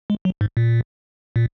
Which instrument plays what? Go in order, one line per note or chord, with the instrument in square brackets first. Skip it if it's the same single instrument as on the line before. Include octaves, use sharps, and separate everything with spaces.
[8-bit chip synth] G#3
F#3
G#2
A#2
A#2